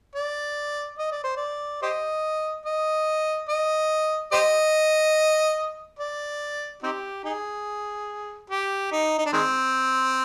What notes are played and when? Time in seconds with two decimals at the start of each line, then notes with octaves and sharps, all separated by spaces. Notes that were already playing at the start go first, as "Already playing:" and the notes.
0.15 D5
0.99 D#5
1.11 D5
1.24 C5
1.37 D5
1.82 G4 C5 D#5
2.65 D#5
3.49 D#5
4.32 G4 C5 D#5
5.99 D5
6.83 C4 D#4 G4
7.24 D#4 G#4
8.50 G4
8.92 D#4
9.18 D#4
9.26 D4
9.33 D#3 G#3 C4